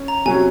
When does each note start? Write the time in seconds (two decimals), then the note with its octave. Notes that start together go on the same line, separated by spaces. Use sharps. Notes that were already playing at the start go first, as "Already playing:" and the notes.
Already playing: C#4
0.08 A#5
0.26 C3 F#3 C#4 G#5